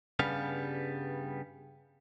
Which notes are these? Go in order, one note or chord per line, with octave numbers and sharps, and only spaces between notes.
G2 C#3 G3 B3 F5